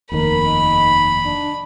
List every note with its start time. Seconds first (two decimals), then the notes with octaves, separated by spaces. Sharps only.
0.12 F1 D#2 D#3 A#4 B5
0.46 D#4
1.25 D4